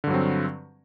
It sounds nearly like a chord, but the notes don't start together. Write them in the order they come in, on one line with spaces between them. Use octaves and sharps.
D3 G2 F#3 C4